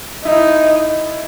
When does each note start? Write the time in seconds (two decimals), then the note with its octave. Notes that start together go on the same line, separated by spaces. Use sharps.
0.25 D#4 E4